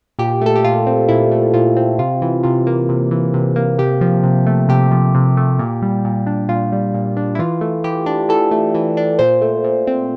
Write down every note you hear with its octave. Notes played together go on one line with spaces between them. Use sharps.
A#2 G4
A3 A4
G4
A#2 F4
C4
A#2 E4
A3
A#2 F4
C4
C3 F4
E3
C3 F4
A#3
C3
E3
C3
A#3
C3 G4
F3
C3
A3
C3 G4
F3
C3
A3
A#2
G3
A#2
D4
A#2 F4
G3
A#2
D4
E4
E3 F4
A3
E3 G4
D4
E3 A4
A3
E3
D4
A#2 C5
A3
A#2
C4